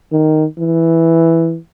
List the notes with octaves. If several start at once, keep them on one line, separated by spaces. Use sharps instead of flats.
D#3
E3